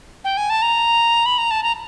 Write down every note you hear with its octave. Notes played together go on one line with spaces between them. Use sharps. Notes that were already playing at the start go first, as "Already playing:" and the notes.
G5
G#5
A5
A#5
B5
A#5
A5
A#5